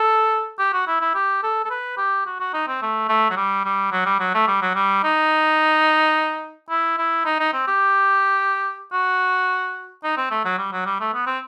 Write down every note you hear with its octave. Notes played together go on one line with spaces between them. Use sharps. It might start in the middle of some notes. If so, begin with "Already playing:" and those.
Already playing: A4
G4
F#4
E4
E4
G4
A4
A4
B4
G4
F#4
F#4
D#4
C4
A3
A3
F#3
G3
G3
F#3
G3
F#3
A3
G3
F#3
G3
D#4
E4
E4
D#4
D#4
C4
G4
F#4
D#4
C4
A3
F#3
G3
F#3
G3
A3
B3
C4